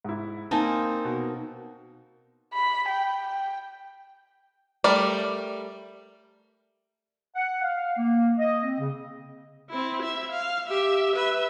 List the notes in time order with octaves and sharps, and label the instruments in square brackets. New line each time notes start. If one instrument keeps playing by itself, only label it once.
[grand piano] G#2 E4
[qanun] A#3 C4 D#4 [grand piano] G#5 A5
[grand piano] B2
[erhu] B5
G5
G5
[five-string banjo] G3 A3 A#4 D5
[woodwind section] F#5
F5
A#3
D#5
C4
C#3
[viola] C4 E4
E5
F5
G4 E5
B4 E5